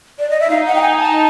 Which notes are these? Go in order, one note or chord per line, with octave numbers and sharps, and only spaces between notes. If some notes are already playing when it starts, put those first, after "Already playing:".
D5
D#5
E5
D#4 F5
F#5
G5
G#5
A5